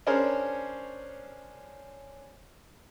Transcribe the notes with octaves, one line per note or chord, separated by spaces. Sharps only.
C#4 D4 G#4 A#4 C5 C#5